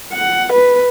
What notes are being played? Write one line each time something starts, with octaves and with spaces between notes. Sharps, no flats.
F#5
B4